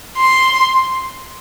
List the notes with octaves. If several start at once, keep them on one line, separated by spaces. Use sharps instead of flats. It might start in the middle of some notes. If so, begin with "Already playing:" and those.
C6